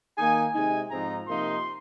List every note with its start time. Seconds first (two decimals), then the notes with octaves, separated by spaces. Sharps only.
0.17 D#3 A#3 D#4 G#5
0.54 C3 G#3 D#4 G#5
0.91 G#2 F3 C4 D#4 A#5
1.28 C3 F3 A#3 D#4 C6